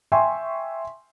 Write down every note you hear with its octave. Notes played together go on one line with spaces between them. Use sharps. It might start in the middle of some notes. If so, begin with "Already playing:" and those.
E5 G5 G#5 C6 C#6